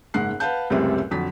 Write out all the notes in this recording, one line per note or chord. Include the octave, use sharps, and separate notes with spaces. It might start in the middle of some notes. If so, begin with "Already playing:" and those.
F#1 G#2 F#5 F#6 C7
B4 F5 F#5 A5 G6
C#2 F#2 A2 C3 G3 C4
F2 D3 F#3 B6